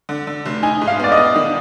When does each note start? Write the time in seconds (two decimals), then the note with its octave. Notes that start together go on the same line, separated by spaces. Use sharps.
0.09 D3
0.27 D3
0.46 F1
0.63 D#4 G#5
0.81 G#2
0.88 F5
1.00 B3 D5
1.12 D#5
1.17 B3
1.36 D#3